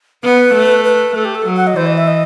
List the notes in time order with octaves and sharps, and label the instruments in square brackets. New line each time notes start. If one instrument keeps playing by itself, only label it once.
[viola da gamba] B3 [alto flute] B4
[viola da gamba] A3
[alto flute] B4
[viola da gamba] A3 [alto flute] A4
[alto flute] G4
A4
[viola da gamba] F#3
[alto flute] F#5
D#5
[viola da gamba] E3 [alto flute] C5
[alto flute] D#5
E5
D#5